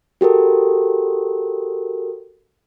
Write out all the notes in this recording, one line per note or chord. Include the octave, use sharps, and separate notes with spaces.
F#4 G4 A4 A#4